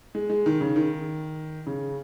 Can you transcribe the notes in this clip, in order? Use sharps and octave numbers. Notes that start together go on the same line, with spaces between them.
G#3
G#3
D#3
C#3
D#3
C#3